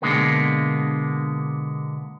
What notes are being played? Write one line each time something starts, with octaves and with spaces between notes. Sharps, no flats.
B2 D3 G#3 A#3 B3